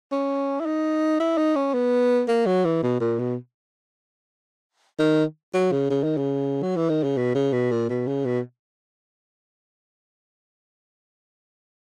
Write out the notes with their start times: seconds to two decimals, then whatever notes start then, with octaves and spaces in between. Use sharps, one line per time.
0.11 C#4
0.60 E4
0.66 D#4
1.20 E4
1.37 D#4
1.56 C#4
1.74 B3
2.28 A#3
2.46 F#3
2.65 E3
2.83 B2
3.00 A#2
3.19 B2
4.99 D#3
5.54 F#3
5.72 C#3
5.90 C#3
6.03 D#3
6.17 C#3
6.62 F#3
6.76 E3
6.89 D#3
7.03 C#3
7.17 B2
7.35 C#3
7.53 B2
7.71 A#2
7.89 B2
8.07 C#3
8.25 B2